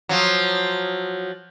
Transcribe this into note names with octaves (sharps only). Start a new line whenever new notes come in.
F3 F#3